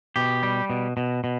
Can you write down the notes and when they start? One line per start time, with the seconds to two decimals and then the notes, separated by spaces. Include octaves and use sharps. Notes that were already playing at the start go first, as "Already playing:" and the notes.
0.16 B2 G4
0.43 G3
0.70 B2
0.97 B2
1.24 B2